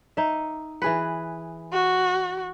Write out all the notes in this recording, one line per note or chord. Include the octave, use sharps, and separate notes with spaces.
D#4 E5
E3 G#4 B4
F#4